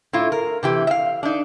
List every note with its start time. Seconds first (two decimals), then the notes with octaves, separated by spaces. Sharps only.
0.13 A2 E4 F4
0.32 A#4
0.63 C3 E3 G4
0.87 E5 F5
1.23 D4 D#4